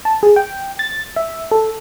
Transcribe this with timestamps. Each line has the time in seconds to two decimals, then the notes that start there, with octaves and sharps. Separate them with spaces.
0.05 A5
0.23 G#4
0.36 G5
0.79 A6
1.16 E5
1.51 A4